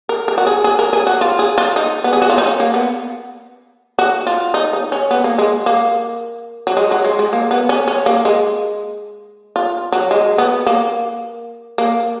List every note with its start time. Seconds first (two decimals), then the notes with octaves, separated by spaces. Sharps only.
0.09 A#4
0.28 A#4
0.38 F#4
0.47 G#4
0.64 G#4
0.79 A#4
0.93 G#4
1.07 F#4
1.21 F4
1.39 G#4
1.58 F4
1.76 D#4
2.04 B3
2.13 G#4
2.22 F#4
2.30 F4
2.38 D#4
2.46 C#4
2.60 A#3
2.74 B3
3.99 F#4
4.27 F4
4.54 D#4
4.73 D#4
4.92 C#4
5.11 B3
5.24 A#3
5.38 G#3
5.66 A#3
6.67 F#3
6.77 G#3
6.91 F#3
7.05 G#3
7.19 G#3
7.33 A#3
7.51 B3
7.69 C#4
7.88 C#4
8.06 A#3
8.25 G#3
9.56 F4
9.92 F#3
10.11 G#3
10.38 B3
10.66 A#3
11.78 A#3